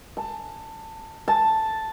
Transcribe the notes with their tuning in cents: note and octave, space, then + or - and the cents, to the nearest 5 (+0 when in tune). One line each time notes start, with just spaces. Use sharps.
A5 +20
A5 +0